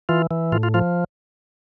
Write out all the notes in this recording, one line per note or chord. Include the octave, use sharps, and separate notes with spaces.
E3 F4
E3
A2 F4
F4
F3 F4